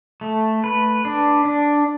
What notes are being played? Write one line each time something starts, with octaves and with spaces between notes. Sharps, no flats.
A3
B4
D4
D4